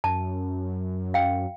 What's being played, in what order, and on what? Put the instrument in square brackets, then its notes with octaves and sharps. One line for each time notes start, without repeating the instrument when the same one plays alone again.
[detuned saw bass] F#2 [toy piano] A5
[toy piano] F5 G5